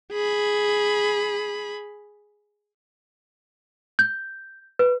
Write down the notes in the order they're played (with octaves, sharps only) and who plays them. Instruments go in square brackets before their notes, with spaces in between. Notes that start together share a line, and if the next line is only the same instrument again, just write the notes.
[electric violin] G#4 B5
[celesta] G6
B4